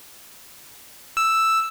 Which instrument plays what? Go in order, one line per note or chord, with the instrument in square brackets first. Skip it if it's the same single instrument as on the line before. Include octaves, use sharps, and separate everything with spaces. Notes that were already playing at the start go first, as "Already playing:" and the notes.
[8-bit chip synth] E6